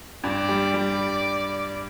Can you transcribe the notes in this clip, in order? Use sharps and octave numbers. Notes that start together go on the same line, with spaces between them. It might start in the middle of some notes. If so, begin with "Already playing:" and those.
G2 D5
G3
G3